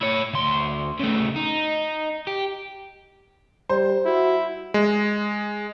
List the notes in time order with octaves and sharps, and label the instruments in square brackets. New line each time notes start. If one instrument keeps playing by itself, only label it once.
[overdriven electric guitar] E4 C#5
D2 C6
C#3 A3
D#4
G4
[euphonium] G3 [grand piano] C5
[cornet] E4 [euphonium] F#4
[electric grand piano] G#3